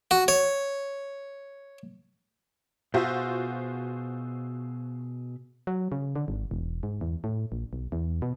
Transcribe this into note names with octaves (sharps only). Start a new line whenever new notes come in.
F#4
C#5
B2 F4 F#4 G#4 C5 E5
F#3
C#3
D3
G#1
E1
G#2
E2
A2
A#1
B1
E2
B2